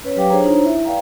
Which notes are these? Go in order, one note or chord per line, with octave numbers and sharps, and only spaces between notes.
C#4 B4 C#5
F#3 G4 B4 F5 G5 D6
D4 G#4 C5 C#5 A#5
D4 D#4 F4 C5 C#5 A#5
E4 E5
B4 D5 F5 G5 A#5